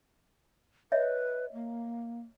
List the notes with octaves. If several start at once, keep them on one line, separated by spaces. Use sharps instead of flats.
B4 C#5 D#5 E5
A#3